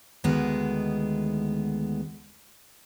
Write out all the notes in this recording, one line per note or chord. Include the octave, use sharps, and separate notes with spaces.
D2 D#3 G#3 B3 E4